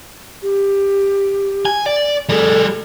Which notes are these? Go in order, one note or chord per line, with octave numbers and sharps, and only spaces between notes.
G4
G#5
D5
G3 G#4 A4